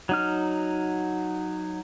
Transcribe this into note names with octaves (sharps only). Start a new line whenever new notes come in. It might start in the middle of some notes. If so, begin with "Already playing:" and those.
F#3 D#4 F6